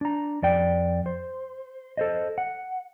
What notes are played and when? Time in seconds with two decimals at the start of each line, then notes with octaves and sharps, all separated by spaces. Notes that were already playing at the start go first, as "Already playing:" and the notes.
0.01 D4 A#5
0.42 F2 D5 G5
1.06 C5
1.97 A4 C5 D#5
2.38 F#5